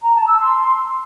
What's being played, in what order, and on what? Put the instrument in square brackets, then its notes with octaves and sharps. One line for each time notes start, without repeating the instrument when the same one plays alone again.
[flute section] A#5
A5
E6
C6